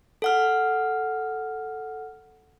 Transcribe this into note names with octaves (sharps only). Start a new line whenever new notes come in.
A4 F#5 F6